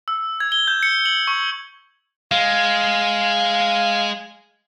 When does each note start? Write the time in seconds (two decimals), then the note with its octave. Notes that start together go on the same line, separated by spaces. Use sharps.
0.08 E6
0.40 G#6
0.52 G7
0.68 G6
0.83 C#7
1.06 F#7
1.27 C#6
2.32 G#3 F5